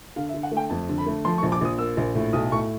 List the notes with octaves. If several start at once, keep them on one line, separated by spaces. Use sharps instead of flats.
D3 F5
E5
D3
F#5
A3
G5
F2 A5
D3
B5
A3
F3 C6
C#6
A#1
D6
A#1 D#6
A#3 E6
A#1
A2
B1 D#6
A2 C#6